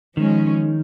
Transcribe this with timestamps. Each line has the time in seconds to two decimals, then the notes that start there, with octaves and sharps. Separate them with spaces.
0.17 D#3 F3 G#3 C#4